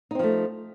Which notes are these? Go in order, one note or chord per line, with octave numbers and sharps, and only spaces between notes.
F3 A3 C4 D#4